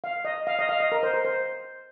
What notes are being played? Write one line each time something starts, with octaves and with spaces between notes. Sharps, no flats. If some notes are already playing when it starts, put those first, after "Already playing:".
F5
D#5
F5
D#5
F5
D#5
A#4
C5
A#4
C5